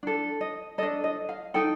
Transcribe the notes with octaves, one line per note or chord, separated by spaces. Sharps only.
D4 A4
D#5
D4 A4 D#5
D#5
F5
D#4 A4 G5